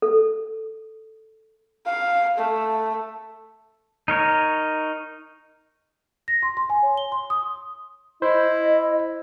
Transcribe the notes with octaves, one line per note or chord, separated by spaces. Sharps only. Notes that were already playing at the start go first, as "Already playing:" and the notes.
A4
F5
A3
D#4 A#4 C#5
A#6
C6
C6
G#5
C#5
G7
C6
D#6
E4 C5 D#5